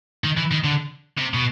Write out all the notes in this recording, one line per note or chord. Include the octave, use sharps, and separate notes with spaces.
D#3
E3
D#3
D3
C3
B2